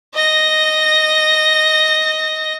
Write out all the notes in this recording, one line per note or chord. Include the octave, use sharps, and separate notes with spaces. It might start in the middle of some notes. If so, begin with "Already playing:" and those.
D#5 A#6